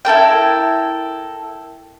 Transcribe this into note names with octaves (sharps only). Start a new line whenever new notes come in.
E4 A4 A#4 G5